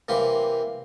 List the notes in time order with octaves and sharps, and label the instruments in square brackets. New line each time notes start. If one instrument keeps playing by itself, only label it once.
[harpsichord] C3 E3 A#3 G4 C6